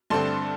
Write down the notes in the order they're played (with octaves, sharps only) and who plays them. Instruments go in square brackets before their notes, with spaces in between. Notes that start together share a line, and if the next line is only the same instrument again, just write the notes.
[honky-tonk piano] G2 D3 A3 C4 A5 C6